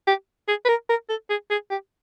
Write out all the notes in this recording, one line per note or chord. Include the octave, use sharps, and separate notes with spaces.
G4
G#4
B4
A#4
A#4
A4
G#4
G#4
G4